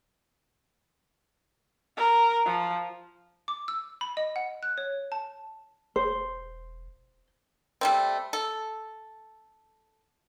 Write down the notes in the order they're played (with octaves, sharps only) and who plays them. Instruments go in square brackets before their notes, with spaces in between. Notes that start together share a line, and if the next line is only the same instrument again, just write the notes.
[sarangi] A#4
F3
[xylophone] D6
E6
B5
D#5
F#5
F#6
C#5
A5
[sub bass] E1 [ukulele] C5
[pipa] G3 A3 C4
A4